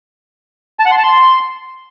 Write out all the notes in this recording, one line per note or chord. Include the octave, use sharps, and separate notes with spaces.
A5
F#5
C6
A5
C6